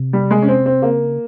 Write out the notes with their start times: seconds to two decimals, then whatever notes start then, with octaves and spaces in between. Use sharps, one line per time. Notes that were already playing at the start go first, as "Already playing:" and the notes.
Already playing: C3
0.13 G3
0.31 G#3
0.42 C#4
0.48 C4
0.66 C4
0.82 C#3 A#3